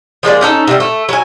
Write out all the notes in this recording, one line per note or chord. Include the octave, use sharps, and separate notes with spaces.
F3 G#3 A#3 D5
C#4 D#4 A4
C3 G3
A3
F#3 G#5